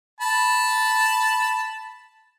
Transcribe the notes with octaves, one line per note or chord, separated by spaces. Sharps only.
A5 B5